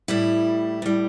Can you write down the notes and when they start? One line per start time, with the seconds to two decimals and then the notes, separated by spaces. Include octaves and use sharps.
0.08 A2 G3 E4
0.82 A2 G3